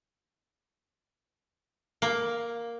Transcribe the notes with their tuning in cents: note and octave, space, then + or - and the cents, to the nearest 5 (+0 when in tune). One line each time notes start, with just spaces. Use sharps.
A#3 +5